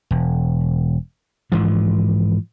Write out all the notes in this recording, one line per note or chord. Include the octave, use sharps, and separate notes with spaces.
E1
G#2 E3 F3